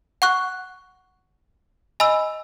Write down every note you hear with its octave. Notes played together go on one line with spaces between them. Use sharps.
F#5 C#6 F#6
D#5 G#5 B5 E6